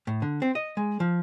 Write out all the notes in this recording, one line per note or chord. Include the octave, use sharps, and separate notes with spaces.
A2
D3
C4
D#5
G#3
F3